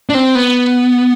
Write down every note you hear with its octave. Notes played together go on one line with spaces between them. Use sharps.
D4
C4
B3